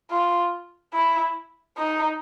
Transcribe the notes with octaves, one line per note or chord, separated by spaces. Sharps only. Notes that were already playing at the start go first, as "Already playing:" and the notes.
F4
E4
D#4